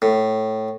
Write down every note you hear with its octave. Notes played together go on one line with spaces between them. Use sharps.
A2